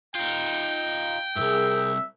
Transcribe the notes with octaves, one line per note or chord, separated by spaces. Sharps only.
D#4 F4 G5
C2 G2 G#4 A#4 E5